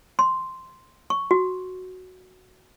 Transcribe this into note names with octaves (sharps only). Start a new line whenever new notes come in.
C6
C#6
F#4